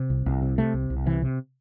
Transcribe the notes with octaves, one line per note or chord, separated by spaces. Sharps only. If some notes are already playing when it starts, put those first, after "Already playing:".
Already playing: C3
C2
C2
C3
C3 A3
C2
C2
C3 E3
C3